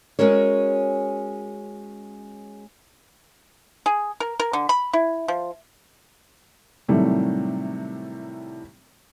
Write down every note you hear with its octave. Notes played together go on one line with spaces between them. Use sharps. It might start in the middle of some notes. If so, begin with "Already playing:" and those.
G#3 C#4 F#4 A#4 C#5
G#4
A#4
A#4
D3
B5
E4
F3
A2 C3 D#3 F#3 G3 A3